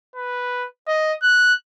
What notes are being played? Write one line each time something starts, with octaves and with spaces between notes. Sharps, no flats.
B4
D#5
F#6